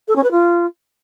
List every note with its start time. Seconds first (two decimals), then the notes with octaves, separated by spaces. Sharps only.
0.08 A4
0.15 C#4
0.23 B4
0.31 F4